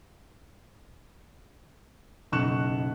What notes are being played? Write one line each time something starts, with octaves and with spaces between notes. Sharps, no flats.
F#1 B1 C#6 F#6 E7